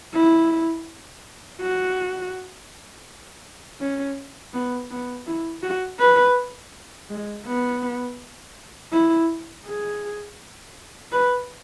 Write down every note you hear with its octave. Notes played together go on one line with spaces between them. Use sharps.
E4
F#4
C#4
B3
B3
E4
F#4
B4
G#3
B3
E4
G#4
B4